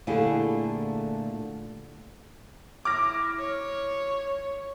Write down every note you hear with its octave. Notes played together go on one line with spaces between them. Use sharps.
A#2 D3 A3 E4 G4 G#4
E4 D6 F6 A#6
C#5